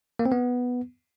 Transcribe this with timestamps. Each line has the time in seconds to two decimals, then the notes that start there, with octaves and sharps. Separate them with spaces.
0.19 A#3
0.26 C4
0.32 B3